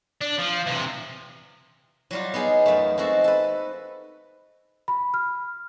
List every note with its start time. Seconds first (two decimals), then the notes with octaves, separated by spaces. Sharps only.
0.21 D4
0.38 F3
0.67 C3 E3
2.11 F#3 G3 F4
2.34 B3 D#4 G#4
2.66 F#2 A3
2.98 G#3 C4 F#4 A4
3.24 A4 B4
4.88 B5
5.14 F6